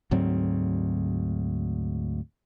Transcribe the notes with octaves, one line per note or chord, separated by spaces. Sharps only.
D2 G#2 F#3 C4